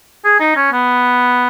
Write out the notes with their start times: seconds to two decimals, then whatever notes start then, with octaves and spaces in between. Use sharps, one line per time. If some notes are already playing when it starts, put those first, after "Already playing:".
0.25 G#4
0.40 D#4
0.56 C#4
0.72 B3